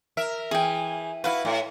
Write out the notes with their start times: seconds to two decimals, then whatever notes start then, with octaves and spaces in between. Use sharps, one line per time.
0.17 A#4 E5
0.51 E3 G#4 G5
1.24 E4 F#4 B4 F5
1.45 A2